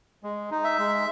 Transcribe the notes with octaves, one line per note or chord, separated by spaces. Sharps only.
G#3
D#4
E5
G#3